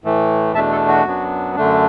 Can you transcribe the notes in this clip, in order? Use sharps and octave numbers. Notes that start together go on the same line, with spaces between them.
A2 E3 A3
E2 B2 A3 D4 E5 A5
A4
F#4
F#2 F#3 B3 D4
F#2 D3 A3 D4